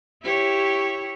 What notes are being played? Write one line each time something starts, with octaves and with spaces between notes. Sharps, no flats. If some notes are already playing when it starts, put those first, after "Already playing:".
E4 G4 C#5